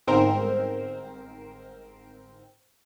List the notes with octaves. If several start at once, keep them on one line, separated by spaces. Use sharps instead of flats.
G1 G#2 C4 A#4 C5